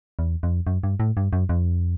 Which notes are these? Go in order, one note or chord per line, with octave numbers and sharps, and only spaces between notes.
E2
F2
F#2
G2
A2
G2
F#2
F2